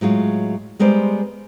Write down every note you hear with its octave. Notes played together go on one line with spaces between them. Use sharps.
A2 F#3 G#3 F4
G3 G#3 B3 A#4 C5 D5